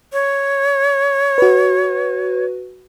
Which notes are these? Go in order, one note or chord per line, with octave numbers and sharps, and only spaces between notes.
C#5
F#4 B4